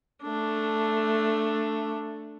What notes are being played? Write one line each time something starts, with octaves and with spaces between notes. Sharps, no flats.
A3 D4